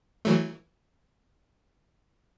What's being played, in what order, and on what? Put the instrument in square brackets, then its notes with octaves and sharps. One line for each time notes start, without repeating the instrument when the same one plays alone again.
[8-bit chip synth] E3 F#3 A3